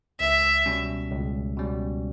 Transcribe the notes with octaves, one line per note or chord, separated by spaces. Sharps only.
C#2 E5
B2 G3 C#4
C#2
B2 G3 C#4